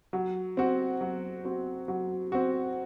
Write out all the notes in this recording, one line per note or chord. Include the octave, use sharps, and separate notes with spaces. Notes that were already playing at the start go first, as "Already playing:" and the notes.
F#3
C4 F#4
F#3
C4 F#4
F#3
C4 F#4